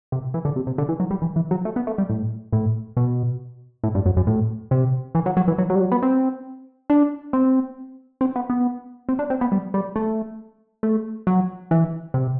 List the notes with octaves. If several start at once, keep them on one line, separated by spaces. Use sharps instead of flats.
C3
E3
D3
C3
C3
D3
E3
F#3
G3
E3
E3
F#3
A3
B3
A3
G3
A2
A2
B2
A2
G2
F#2
F#2
A2
C3
E3
F#3
F#3
E3
F#3
F#3
G3
F#3
B3
C4
D4
C4
C4
B3
B3
C4
D4
C4
B3
G3
G3
A3
A3
F#3
E3
C3